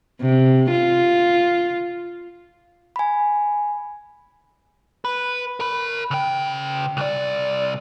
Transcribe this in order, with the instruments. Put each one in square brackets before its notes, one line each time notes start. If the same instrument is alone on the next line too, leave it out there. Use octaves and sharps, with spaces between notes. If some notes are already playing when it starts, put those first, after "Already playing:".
[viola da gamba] C3
F4
[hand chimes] G#5 B5
[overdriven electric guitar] B4
A#4 B5
C#3 G5
C2 D5